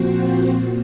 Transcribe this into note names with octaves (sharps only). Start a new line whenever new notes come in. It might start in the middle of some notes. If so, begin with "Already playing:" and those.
Already playing: A#2 F3 C4 F#4 C5
A#2